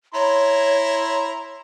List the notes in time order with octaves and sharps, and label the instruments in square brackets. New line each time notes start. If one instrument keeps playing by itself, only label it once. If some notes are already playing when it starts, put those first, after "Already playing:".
[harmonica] E4 A#5 C6 [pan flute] C#5